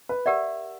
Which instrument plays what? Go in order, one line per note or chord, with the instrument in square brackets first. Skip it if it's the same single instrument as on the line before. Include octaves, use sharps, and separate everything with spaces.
[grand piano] B4
[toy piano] G4 A#4 D5 F#5 [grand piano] E5